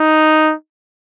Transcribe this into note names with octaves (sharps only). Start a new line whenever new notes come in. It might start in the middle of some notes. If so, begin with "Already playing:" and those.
Already playing: D#4